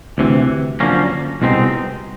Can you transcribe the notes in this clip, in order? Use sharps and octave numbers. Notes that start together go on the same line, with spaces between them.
D2 C3 E3
F#2 D3 F3 A#3 C#4
C2 B2 G#3 C4 D#4